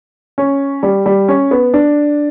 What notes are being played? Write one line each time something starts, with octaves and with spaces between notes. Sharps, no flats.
C#4
G3
G3
C#4
B3
D4